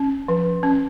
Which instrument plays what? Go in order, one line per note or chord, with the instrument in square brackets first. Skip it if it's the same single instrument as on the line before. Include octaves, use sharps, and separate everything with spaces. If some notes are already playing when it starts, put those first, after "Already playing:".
Already playing: [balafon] C#4
F3
C#4